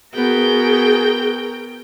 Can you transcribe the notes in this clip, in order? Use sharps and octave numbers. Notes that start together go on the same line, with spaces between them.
B3 F#4 G#4 A#4 G5